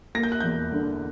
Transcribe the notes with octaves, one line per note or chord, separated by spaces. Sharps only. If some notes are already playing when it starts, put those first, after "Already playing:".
A#3 A#6
G6
F#6
E2 G6
D3